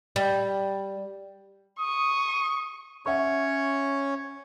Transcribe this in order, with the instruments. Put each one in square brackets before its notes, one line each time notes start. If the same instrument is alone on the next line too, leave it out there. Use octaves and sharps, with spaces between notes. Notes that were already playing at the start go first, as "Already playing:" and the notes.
[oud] G3
[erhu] C#6 [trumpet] D#6
[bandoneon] C#4 C#5 [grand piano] E5 F#5 C#6